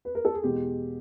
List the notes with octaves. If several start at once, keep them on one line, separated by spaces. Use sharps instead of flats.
B4
A#4
A4
G#4
E2 B2 G#3 G4